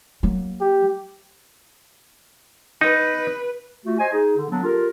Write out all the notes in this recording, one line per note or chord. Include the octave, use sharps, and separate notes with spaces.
F#3 A#3
G4
D#4 B4
A3 F4 F#4
C5 D#5 G#5
D#4 G#4
D3
F#3 A#3 B3 D4
F4 G4 A4 A#4